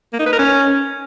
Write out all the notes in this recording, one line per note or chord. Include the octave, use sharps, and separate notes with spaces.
A#3
D#4
B4
A#4
C#4